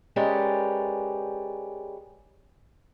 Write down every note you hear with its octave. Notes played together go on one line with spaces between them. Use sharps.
G#3 C#4 G4 A#4 B4 D5